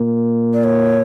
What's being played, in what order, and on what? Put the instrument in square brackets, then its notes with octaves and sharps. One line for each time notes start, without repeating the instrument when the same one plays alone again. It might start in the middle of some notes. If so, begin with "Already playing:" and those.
Already playing: [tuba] A#2
[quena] D5
C#5